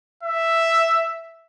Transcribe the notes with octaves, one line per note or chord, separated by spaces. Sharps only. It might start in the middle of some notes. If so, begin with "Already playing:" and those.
E5